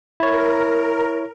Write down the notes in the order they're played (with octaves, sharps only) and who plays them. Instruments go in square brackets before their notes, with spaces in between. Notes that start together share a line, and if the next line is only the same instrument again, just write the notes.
[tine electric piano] E4 C#5 [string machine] A#4